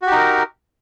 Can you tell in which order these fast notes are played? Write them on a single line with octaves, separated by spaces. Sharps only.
F#4 G4 D#4 A#4